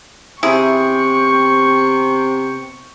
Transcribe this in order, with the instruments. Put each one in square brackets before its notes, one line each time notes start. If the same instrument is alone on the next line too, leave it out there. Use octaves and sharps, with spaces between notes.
[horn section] C3 B3 G5 [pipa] E4 G#4 [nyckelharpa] C#6